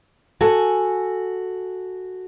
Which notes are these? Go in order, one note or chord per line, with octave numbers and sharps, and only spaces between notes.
F#4 A4 G#5